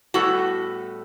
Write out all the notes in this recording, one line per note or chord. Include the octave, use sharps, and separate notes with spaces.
A2 G3 B3 F#4 A4